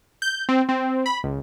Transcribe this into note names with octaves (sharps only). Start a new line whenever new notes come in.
G6
C4
C4
B5
C#2